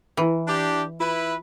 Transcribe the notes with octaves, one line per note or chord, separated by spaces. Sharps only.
E3 E4 B4
D4 G4
E4 F4 B4